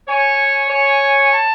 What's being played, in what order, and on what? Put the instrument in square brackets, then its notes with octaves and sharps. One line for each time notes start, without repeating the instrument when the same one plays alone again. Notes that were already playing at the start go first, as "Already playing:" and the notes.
[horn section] C#5 [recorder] G#5
[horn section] C#5
[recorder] A5